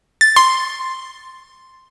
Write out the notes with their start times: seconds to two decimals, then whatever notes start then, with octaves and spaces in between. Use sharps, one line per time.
0.21 A6
0.36 C6